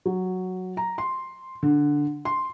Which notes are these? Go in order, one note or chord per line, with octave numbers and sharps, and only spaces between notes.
F#3
A#5
C6
D3
C6